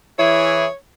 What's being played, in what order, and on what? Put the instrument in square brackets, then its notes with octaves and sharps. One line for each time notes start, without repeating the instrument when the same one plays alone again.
[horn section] E3 E4 G#4 [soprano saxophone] C#5